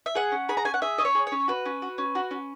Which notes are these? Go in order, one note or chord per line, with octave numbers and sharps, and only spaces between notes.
E5
G#4 F#5
C#4
G#4 B5
A#5
C#4 G#5
F#5
G#4 E5
C#4 D#5
C#5
G#4
C#5
C#4
F#4 B4
C#4
F#4
C#4
F#4
C#4